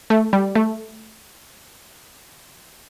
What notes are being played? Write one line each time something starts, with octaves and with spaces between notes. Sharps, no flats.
A3
G3
A3